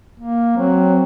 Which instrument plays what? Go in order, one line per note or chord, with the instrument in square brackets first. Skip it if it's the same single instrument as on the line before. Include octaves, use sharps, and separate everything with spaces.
[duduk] A#3
[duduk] F#3 [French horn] C4